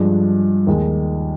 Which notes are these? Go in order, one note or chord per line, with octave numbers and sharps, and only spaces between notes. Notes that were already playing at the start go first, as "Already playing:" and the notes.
Already playing: G2 F3 G#3
D#2 D#3 G#3